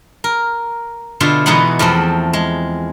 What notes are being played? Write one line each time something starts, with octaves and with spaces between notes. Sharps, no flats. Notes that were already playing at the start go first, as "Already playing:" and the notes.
A#4
B2 D3 F4 E5 C6
B2 E3 G#3 B3 D#4 F#5
E2 F3 A3 C4
G#3